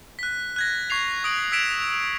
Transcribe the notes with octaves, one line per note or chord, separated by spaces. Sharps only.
F#6 B6
F#6 G#6 A#6
C#6 G#6 C7 F7
D#6 D7 F#7
E6 G#6 B6 D7 E7 F7